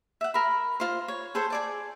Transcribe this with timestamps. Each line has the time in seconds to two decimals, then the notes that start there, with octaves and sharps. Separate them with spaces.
0.21 E5 F#5
0.34 A#4 B5
0.80 F4 C5
1.08 C#5
1.35 G#4 A4 C5 C#5
1.50 G#4 D5 A5